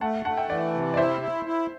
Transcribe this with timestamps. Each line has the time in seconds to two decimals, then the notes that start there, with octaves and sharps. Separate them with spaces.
0.01 A3 F#5 A5
0.25 A3 F#5 A5
0.37 E5 G5
0.49 E3 D5 F#5
0.73 C3
0.94 D5
0.97 E4 C5 E5
1.21 E4
1.45 E4